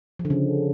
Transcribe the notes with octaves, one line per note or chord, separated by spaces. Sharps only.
F3
D3
C#3